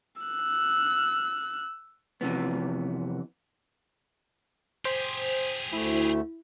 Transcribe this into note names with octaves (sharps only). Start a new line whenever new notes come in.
E6 F#6
F2 C3 E3 B3
G4 G#4 C5
D2 A3 E4